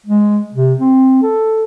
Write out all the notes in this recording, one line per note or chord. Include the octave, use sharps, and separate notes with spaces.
G#3
C3
C4
A4